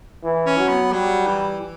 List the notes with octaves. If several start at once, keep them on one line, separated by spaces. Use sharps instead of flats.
E3
C#4
F#3
B3
F#3 G3
E3
E3